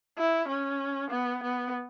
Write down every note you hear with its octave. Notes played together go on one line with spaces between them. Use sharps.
E4
C#4
B3
B3